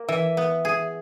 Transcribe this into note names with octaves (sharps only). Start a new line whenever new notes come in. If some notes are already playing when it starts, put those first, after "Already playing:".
Already playing: A#3
E3 E5
B3
G#4